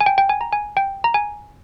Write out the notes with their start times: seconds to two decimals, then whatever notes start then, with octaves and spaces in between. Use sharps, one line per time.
0.01 G#5
0.06 G5
0.18 G5
0.29 G#5
0.41 A#5
0.52 G#5
0.77 G5
1.04 A#5
1.14 G#5